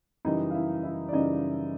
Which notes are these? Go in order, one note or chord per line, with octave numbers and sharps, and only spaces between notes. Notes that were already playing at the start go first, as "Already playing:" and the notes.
F#2 C#3 E3 G3 D#4 D#5
F5
E4 E5
E4 E5
D5
F#2 C#3 E3 G3 D#4 D#5